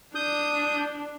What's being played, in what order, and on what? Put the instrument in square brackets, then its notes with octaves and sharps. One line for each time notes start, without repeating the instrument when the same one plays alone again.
[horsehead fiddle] D4 [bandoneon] D#6 G6